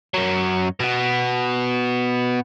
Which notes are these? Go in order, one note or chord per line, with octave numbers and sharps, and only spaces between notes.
F#2 F#3
B2 B3